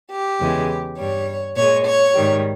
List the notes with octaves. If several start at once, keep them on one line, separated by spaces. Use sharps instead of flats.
G4
E2 C#3 E3 G#3
G2 G3 C#5
A#2 G#3 C#5
C#5
G#2 D#3 G3